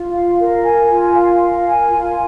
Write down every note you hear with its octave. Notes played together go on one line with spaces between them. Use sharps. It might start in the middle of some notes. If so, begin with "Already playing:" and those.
Already playing: F4
F5
A#4
G#5
F4
F5
A#4
G#5
F4